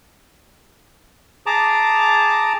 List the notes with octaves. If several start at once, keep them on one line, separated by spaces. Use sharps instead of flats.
G#4 A5 A#5 D6